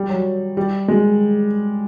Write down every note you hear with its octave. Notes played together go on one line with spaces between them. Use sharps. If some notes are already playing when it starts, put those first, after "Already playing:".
Already playing: G3
F#3
G3
G#3